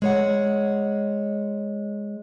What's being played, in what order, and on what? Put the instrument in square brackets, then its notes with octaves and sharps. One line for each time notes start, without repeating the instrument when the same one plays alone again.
[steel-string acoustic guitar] G#3 C#5 F#5